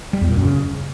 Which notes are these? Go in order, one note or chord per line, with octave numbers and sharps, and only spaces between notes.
G3
E2
A#2
F#2
C#3